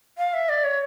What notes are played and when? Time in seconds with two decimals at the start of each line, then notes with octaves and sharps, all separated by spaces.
0.18 F5
0.34 E5
0.49 D5
0.64 C#5